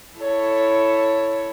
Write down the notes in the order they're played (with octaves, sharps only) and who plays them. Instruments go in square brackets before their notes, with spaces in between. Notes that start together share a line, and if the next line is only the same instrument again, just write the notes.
[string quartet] E4 A4 C#5